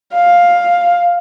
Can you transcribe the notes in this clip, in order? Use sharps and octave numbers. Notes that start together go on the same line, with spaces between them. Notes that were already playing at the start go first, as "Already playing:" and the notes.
F5